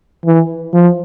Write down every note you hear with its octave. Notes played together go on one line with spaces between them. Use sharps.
E3
F3